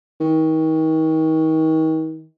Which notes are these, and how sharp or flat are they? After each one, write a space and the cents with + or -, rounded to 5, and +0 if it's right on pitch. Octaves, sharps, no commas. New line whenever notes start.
D#3 +35